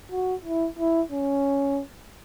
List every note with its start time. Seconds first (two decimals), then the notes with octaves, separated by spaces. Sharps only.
0.11 F#4
0.45 E4
0.79 E4
1.11 C#4